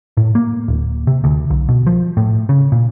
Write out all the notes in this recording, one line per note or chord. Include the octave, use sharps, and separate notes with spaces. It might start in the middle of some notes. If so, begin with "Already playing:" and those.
A2
A#3
D1
C3
D2
B1
B2
F3
A2
C#3
A#2